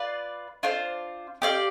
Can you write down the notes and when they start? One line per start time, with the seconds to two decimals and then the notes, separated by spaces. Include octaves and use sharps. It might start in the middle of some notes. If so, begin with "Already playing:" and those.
Already playing: F4 B4 D5 F5
0.63 D4 F4 C5 F5
1.42 G4 D5 F5